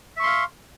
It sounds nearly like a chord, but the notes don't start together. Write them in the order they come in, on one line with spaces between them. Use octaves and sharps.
E5 C#6 C6 F5